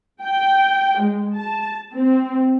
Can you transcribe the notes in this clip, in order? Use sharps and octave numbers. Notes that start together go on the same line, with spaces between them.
G5
G#3
A5
C4